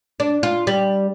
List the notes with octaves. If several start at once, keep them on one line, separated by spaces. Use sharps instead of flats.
D4
F4
G3